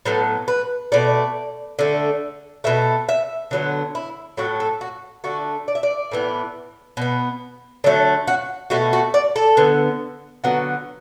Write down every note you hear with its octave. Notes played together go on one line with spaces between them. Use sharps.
A2 F#3 B3 A4
B4
B2 A3 D5
D3 A3
B2 A3 E5
E5
D3 F#3 B3
E4
A2 F#3 A3 F#4
A4
F#4
D3 A3 F#4
D5
E5
D5
A2 E3 B3
B2 B3
D3 F#3 A3 D4
F#4
B2 A3 F#4
F#4
D5
A4
D3 B3
D3 F#3 B3 F#4